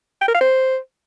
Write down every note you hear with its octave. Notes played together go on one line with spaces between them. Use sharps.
G5
A#4
F5
C5